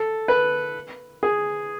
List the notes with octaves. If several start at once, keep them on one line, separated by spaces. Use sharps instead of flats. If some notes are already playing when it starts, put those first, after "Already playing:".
Already playing: A4
B4
G#4